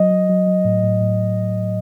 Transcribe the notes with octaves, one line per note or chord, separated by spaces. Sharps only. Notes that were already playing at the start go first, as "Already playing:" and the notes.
Already playing: F#3 D#5
F#3
F#3
F#3
A2
A2
A2